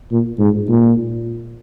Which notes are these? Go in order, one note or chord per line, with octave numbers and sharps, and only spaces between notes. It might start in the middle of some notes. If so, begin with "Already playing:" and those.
A#2
G#2
A#2